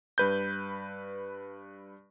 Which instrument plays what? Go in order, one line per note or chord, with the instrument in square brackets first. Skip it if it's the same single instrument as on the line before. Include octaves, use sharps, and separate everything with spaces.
[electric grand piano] G2 B4 G6